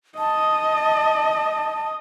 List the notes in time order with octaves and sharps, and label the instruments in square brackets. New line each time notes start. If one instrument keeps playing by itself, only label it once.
[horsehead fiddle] D#5 [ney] A5